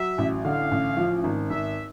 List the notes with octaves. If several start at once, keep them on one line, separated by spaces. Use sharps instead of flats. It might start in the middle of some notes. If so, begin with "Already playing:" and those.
Already playing: F#3 E5
A1
D3 F5
A1
F3
G#1
G#1 E5